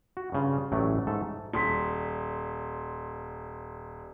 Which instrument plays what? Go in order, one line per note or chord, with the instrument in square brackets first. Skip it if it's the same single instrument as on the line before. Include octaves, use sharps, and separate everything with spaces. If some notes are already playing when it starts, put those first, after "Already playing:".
[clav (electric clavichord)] F#4
G2 C#3 F4
A1 A2 F#3 A3 D5
G#2 A3 A4
[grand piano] D#1 C6 B6